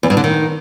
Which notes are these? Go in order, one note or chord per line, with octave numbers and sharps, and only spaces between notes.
E2
G2
D3
D#3